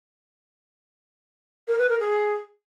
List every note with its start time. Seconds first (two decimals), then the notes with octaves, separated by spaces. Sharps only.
1.67 A#4
1.78 B4
1.89 A#4
1.99 G#4